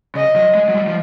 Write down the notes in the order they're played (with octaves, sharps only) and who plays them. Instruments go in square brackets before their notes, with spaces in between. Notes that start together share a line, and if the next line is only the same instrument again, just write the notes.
[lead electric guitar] C#3 [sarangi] D#5
[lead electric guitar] F#3
G#3
F#3
G3
F3